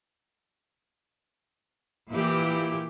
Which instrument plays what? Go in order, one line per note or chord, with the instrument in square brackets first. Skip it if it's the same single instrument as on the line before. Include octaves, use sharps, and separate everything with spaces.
[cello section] A#2 E3 E4 G4